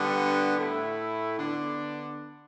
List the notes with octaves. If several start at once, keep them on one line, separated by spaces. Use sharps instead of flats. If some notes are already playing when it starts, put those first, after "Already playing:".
Already playing: D3 G3 B3 D4
A2 A3 E4
D3 B3 D4